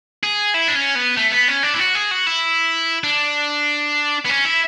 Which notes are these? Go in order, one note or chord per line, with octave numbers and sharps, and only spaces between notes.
G#4
E4
D4
C#4
B3
A3
B3
C#4
D4
E4
F#4
G#4
F#4
E4
D4
B3
C#4
E4